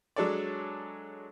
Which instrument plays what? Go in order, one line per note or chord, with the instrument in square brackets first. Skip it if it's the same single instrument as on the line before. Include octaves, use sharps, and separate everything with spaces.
[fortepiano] F#3 G#3 D4 A4 C#5 D5